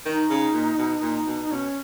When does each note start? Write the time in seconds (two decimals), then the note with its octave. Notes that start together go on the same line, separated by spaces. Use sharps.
0.06 D#3 D#4
0.30 C#3
0.54 A#2
0.78 B2
1.02 A#2
1.26 B2
1.41 D#4
1.50 B2 C#4